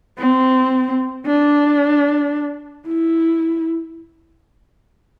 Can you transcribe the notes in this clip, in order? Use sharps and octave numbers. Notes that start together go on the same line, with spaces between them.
C4
D4
E4